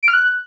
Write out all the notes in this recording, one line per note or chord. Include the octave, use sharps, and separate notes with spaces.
D7
F6
F#6